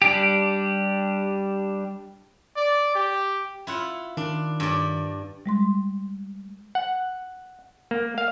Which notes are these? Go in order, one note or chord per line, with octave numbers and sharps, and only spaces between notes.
G3 D4 G4
D5
G4
E4 F4 F#5
D#3 D4
G2 D5
G3 G#3 C6
F#5
A#3
F5